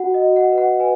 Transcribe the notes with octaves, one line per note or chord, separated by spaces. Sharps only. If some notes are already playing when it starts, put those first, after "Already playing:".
Already playing: F#4 F#5
D#5
F#4
F#5
B4
F#5
B4 G#5